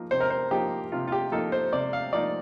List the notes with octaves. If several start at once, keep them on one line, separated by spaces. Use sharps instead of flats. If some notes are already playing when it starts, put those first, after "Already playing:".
Already playing: F3 A#3 D#4
C3 C5
A#4
C5
F3 A#3 D#4 G4
C3 F4
F4
G4
F3 A#3 D#4 A4
C5
C3 D5
F5
F3 A#3 D#4 D5